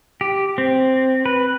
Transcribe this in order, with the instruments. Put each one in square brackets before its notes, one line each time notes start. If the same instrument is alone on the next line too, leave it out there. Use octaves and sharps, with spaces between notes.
[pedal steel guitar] G4
C4
B4